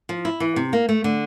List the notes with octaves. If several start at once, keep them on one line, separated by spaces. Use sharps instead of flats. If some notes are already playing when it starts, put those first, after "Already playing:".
F3
E4
E3
C3
A#3
A3
D3